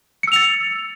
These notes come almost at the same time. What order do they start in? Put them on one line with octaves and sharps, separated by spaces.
C#7 E6 F7 A6